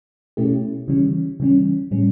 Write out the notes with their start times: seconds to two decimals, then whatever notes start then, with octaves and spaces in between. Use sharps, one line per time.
0.37 B2 A3 C#4 E4 G4
0.88 C#3 E3 G3 C#4
1.40 C#3 E3 G3 C#4
1.91 A2 G3 C#4